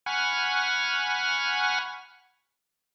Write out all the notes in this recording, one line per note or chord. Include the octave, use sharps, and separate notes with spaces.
F#5 G#5 B5 C#6 F6